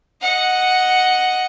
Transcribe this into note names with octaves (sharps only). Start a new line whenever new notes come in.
D#5 F#5